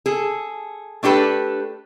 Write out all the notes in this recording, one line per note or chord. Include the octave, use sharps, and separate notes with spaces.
G#4 A4
A3 D4 G4 A4 B4